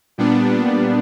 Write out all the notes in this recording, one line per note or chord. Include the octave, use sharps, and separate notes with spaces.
A#2 G3 B3 D4